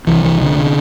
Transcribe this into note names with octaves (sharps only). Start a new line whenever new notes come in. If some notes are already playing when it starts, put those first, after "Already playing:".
C2 C3 E3
E3
D3
C3